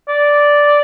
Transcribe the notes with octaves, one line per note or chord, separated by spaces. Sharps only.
D5